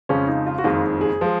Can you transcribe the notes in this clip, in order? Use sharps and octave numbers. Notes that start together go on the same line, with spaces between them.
F2 C#3 F3 G#3 C#4
D#4
F4
F#4
F#1 F2 D#3 G#3 F4
G#4
F3 G#3